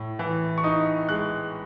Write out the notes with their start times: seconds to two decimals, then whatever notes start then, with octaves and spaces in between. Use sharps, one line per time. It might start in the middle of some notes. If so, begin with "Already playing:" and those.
Already playing: A2
0.19 E3
0.58 C#6
0.64 D#4 D#6
1.09 G#3 F#6